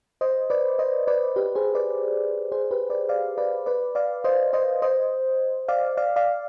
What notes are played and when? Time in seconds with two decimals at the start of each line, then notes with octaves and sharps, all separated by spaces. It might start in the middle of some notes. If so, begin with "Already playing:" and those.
0.21 C5 D#5
0.50 B4 D5
0.79 C5 D#5
1.07 B4 D5
1.36 G4 B4
1.55 G#4 C5
1.75 B4 D5
2.52 G#4 C5
2.71 G4 B4
2.90 B4 D5
3.09 D5 F5
3.38 B4 D5
3.66 B4 D5
3.95 D5 F5
4.24 C5 D#5
4.53 C5 D#5
4.82 C5 D#5
5.68 D5 F5
5.97 D5 F5
6.16 D5 F5